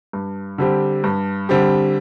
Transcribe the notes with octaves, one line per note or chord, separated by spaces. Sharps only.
G2
D3 G3 C4 G4
G2
D3 G3 C4 G4